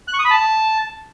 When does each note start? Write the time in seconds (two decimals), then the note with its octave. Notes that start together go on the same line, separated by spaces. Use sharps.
0.08 F#6
0.14 C#6
0.19 D#6
0.25 B5
0.31 A5